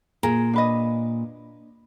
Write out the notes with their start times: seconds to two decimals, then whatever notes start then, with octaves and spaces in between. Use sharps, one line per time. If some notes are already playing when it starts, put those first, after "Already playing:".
0.23 A#2 G#4 A#4
0.53 D4 B4 D#5